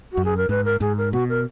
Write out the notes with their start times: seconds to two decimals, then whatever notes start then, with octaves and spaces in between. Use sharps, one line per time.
0.12 F#4
0.17 F#2
0.25 G#4
0.37 A#4
0.49 G#2 B4
0.65 A#4
0.81 G#2 G#4
0.98 A#4
1.13 B2 F#4
1.29 A#4